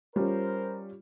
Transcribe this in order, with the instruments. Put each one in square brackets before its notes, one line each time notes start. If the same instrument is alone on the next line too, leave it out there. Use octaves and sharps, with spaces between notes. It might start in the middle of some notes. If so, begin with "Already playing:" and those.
[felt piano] G3 C#4 F4 [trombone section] A#4 C5